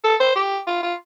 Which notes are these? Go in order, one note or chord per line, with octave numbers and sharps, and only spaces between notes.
A4
C5
G4
F4
F4